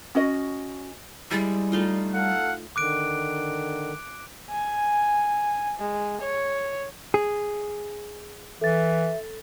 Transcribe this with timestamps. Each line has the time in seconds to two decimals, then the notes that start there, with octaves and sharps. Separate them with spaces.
0.15 C#4 F#4 D#5
1.31 G3 G#3 E4 G4
1.72 A3 D#4 F4
2.14 A4 F5 F#5
2.76 D3 D#3 D6 F#6 D7
4.51 G#5
5.79 G#3
6.21 C#5
7.14 G#4
8.61 E3 A4 E5 A6